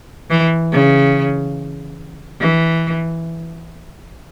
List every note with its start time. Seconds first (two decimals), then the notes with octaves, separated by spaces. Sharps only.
0.30 E3
0.72 C#3
2.40 E3